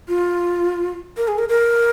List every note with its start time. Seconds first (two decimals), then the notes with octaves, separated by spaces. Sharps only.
0.08 F4
1.17 A#4
1.28 G#4
1.38 A#4
1.49 A#4